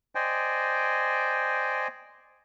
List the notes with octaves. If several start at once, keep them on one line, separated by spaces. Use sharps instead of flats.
C5 D5 D#5 G5 G#5